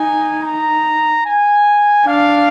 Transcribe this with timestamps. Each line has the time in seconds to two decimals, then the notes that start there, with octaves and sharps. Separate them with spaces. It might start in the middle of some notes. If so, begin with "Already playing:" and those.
Already playing: D#4 G#5
0.41 A#5
1.25 G#5
2.07 D4 F5